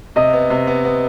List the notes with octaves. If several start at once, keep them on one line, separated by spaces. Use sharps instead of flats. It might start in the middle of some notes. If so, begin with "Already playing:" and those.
C3 D#5
B3
C3
B3
B3